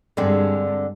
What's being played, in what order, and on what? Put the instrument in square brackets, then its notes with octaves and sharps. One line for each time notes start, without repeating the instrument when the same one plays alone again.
[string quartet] G2 [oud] D3 G#3 C4